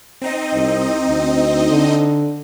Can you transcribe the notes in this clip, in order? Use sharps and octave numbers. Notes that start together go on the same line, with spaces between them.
C4 D#4 D#5
C2
D2
D3